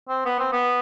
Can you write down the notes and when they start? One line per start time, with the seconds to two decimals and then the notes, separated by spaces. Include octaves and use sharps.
0.09 C4
0.25 B3
0.39 C4
0.52 B3